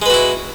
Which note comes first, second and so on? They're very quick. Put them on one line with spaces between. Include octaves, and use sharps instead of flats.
G#3 B4 F#4 E4